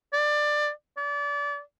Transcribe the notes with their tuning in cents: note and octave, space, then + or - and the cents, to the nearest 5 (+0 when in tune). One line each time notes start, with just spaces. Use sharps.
D5 +20
D5 -30